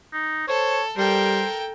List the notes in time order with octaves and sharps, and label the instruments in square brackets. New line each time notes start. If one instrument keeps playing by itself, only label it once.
[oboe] D#4
[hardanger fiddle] A4 [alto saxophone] C5 [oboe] C#5
[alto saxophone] G3 [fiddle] A4 G5 [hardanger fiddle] A#4 [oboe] C5